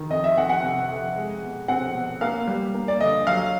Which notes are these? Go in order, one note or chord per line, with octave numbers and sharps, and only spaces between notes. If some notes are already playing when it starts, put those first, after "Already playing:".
Already playing: D#3
F2 D#5
E5
F2 F#5
F#5
C3
F2
G#3
B2
C4 F#5
B2
A#3 F5
G3
A#3
D5
D3 D#5
F#3 F5